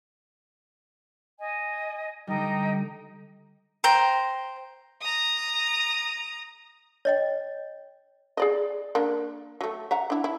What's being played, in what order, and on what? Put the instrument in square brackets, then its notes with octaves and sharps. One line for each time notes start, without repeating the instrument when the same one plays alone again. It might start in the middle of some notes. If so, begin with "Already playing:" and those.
[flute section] D#5 G#5
[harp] D3 G3 [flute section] D#4 D#5 G5
[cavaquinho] C5 G5 A#5
[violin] A#5 D#6
[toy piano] C#5 D#5 G5
[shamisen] G#4 D5 D#5
A#3 D4
F#3 A3
E5 F#5 A#5
D4 E4
E4